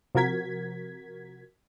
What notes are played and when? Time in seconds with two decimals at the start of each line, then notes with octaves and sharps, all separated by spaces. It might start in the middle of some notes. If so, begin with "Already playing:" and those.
0.15 C3 F3 F#4 A#4 G#6 B6